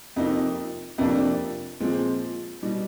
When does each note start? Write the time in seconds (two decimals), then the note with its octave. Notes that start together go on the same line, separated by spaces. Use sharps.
0.16 F2 C3 F3 A#3 D#4
0.98 F2 C3 F3 A#3 D4
1.80 A#2 F3 G#3 C4
2.62 B2 G3